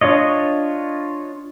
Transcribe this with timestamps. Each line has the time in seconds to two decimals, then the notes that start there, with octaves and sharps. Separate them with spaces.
0.01 D4 F4 C#5 D#5